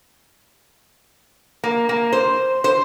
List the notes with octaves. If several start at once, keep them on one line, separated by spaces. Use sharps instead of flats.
A#3
A#3
C5
C5